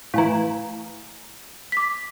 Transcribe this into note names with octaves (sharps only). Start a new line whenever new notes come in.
A2 E3 F5 G#5 A#5
D6 B6